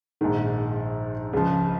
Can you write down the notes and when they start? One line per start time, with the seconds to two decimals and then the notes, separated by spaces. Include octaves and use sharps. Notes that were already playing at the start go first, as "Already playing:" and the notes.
0.21 A#1 G#2 D#3
1.33 C#2 C#3 F3